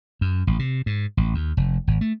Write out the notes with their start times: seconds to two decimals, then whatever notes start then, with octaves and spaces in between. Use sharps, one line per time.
0.21 F#2
0.47 A1
0.59 C3
0.86 G#2
1.17 A1
1.35 D#2
1.57 F1
1.87 G#1
2.01 A3